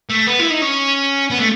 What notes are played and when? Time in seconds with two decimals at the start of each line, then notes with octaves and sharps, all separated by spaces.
0.10 A3
0.27 B3
0.39 E4
0.50 D#4
0.62 C#4
1.31 B3
1.39 A3